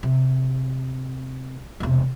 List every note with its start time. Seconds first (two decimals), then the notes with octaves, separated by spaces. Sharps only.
0.03 C3
1.80 E1 C3